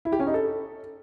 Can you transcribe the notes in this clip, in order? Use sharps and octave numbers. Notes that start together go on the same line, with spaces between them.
E4
G4
C#4
D#4
A4